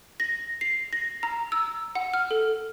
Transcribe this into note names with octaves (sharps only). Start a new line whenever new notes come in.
A#6
C7
A#6
A#5
E6
F#5
F6
A4